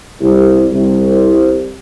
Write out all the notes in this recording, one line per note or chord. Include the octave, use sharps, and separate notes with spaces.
C2
C2